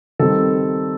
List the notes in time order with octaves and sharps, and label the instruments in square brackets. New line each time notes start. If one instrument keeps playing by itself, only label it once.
[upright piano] D#3 G3 C4 A4